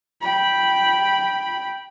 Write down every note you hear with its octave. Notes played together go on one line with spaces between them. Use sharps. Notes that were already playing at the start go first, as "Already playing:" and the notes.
G5 B5